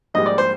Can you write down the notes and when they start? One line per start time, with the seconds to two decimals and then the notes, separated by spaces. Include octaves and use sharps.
0.14 A#1 G#2 G3 D#5
0.26 D5
0.38 C5